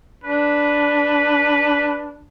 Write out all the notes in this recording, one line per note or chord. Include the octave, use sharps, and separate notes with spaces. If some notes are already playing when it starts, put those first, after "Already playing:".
D4 B4